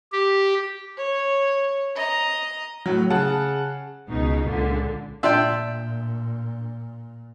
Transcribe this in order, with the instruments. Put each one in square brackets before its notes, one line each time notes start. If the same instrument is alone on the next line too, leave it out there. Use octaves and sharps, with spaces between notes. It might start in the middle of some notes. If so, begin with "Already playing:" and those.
[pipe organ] G4
[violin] C#5
D#5 A#5
[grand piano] A2 F#3
C#3 F#5 A5
[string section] C#2 B2 D#4
C#2 A#2 D3
[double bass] A#2 [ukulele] D4 F4 D5 [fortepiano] E5 G5